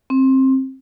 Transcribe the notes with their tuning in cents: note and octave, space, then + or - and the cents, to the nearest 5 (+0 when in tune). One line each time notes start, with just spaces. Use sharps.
C4 +20